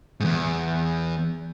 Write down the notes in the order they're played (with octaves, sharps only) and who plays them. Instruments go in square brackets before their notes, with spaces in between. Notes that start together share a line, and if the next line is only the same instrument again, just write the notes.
[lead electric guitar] E2 G#2